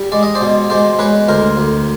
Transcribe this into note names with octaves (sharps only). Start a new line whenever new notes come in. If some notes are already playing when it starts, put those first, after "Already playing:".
Already playing: G3
G#3 D5
D#5
C5 D5
B2
G#3 C5 D5
G#3 B4 C#5
D2 A#4 C5
D2